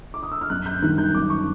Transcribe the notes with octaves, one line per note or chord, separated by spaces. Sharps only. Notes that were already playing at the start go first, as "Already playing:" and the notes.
D6
D#6
E6
F6
F#2 F#6
G6
D#3 G3 F#6
G6
F#2 D6
C#6